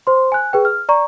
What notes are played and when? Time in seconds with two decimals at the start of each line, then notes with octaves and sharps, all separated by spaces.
0.07 C5 C6
0.32 G#5 F#6
0.53 G#4 B4 G5
0.65 F6
0.89 D5 A#5 C#6